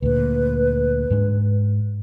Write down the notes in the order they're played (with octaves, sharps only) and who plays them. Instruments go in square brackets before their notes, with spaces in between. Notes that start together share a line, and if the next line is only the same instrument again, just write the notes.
[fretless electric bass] D2 A#2 [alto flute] B4
[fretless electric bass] G#2 G#3 D4